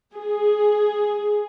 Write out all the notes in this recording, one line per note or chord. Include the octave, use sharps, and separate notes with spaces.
G#4